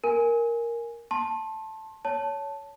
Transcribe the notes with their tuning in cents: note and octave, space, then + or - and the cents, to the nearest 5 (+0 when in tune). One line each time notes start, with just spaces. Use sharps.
A#4 +0 G#5 +0
A5 +0 C6 +35
C#5 +15 A5 +0